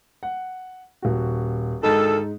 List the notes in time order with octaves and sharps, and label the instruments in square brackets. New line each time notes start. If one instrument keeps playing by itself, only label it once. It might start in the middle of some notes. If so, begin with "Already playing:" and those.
[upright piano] F#5
D#1 F#4
[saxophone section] D2 D#3 A4 [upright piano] G#2 D#4